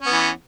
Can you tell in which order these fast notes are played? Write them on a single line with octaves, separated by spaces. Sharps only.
C#4 B3 E3